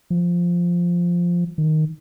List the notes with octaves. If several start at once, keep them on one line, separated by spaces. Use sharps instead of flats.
F3
D#3